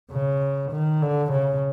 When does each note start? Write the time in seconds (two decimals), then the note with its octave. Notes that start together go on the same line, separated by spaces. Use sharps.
0.11 C#3
0.72 D#3
1.02 D3
1.32 C#3